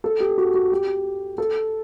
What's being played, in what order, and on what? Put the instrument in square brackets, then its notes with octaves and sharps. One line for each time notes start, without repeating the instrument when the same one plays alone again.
[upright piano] A4
G4
F#4
F#4
G4
A4